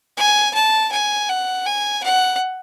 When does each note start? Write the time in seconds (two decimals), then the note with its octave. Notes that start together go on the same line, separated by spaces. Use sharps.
0.17 G#5
0.55 A5
0.92 G#5
1.29 F#5
1.66 G#5
2.04 F#5